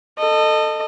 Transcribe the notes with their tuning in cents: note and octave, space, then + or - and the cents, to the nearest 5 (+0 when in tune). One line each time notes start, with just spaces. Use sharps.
A4 +15 D#5 -20